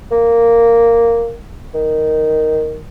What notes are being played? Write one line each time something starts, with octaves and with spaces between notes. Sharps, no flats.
A#3
D#3